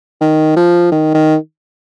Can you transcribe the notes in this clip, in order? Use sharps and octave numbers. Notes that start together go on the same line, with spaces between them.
D#3
F3
D#3
D#3